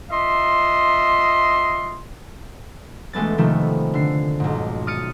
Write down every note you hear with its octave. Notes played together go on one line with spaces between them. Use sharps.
F4 D#5 E5 C6
E1 G#3 A3 B3 A6
C3 D#3 F3 A3 B3
D3 C7
B1 G#2
D#6 F6 A6 C#7 D#7